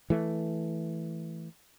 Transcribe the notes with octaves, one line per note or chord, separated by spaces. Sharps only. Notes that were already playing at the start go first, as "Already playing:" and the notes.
E3 A3